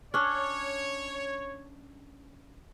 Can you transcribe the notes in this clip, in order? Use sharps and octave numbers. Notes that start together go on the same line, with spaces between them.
C#4 D4 C#5